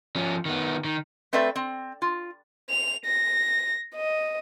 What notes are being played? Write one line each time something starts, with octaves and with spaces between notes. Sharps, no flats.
F3 C#4
D#3 B3
D#3
A3 C4 A4 B4 D5 E5
C4
F4
F7
A#6
D#5